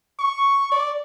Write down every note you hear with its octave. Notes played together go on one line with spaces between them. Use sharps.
C#6
D5